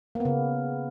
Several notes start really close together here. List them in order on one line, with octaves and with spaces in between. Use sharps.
A#3 B3 C#3